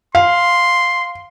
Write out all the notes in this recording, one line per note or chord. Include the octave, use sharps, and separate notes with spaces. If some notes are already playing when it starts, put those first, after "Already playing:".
F5 C6